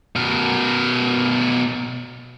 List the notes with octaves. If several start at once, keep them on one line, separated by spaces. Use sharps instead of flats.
B2 A#4